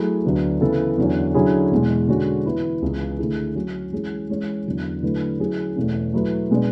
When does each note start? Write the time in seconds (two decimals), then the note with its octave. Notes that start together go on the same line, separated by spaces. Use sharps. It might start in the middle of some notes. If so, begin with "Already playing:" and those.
Already playing: F#3 A3 E4 G#4
0.25 D2 D3 F#3 B3
0.61 C#3 E3 B3 E4 A4
0.98 E2 D3 F#3 C#4
1.35 D3 F#3 C#4 E4 G#4
1.71 E2 B2 G#3
2.08 D3 G#3 C#4 F#4
2.45 E3 B3 E4 B4
2.82 C#2 C#3 E3 B3
3.18 D3 A3 E4 G#4
3.56 F#3 C#4 F#4
3.92 E3 G#3 C#4 G#4
4.29 E3 G#3 C#4 G#4 C#5
4.66 E2 D3 F#3
5.02 D3 F#3 A3 E4 B4
5.40 F#3 C#4 E4 G#4
5.76 E2 B2 A3 C#4
6.14 F#3 A3 E4 B4
6.51 B2 G#3 B3 D4